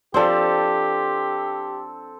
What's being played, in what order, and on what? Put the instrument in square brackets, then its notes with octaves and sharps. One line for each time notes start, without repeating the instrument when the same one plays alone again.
[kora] F3 D4 C5 [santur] C4 A4 [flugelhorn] G4